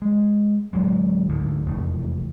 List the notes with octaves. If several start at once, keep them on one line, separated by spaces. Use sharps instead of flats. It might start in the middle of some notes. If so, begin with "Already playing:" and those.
G#3
D1 F#3 G#3
D2 G#2 D3
F1 E2 A3